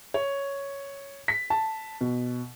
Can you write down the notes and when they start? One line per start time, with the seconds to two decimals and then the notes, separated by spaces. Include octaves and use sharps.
0.14 C#5
1.28 B6
1.50 A5
2.01 B2